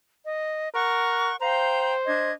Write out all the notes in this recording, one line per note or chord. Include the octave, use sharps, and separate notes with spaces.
D#5
A#4 F#5 C#6 F#6
C5 F5 G5 A#5
D4 D#5 G#6